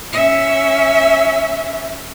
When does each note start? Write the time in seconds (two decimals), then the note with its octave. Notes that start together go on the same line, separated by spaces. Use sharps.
0.13 C#4 E5